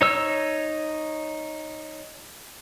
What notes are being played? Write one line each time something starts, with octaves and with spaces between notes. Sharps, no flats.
D#4 C#5 E6